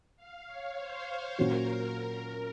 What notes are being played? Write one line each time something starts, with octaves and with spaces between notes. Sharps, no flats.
F5
C#5
C5
A#2 F#3 C#4 F#4 A#4